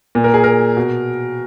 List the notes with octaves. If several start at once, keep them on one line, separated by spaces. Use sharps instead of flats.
A#2
A#4
G#4
A#4
B2